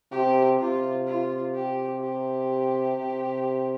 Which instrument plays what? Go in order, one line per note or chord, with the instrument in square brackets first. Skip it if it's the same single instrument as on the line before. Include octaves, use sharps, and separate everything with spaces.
[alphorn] C3 [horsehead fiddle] G4
[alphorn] C3 [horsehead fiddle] F4
[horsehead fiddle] F4
G4
G4
[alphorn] C3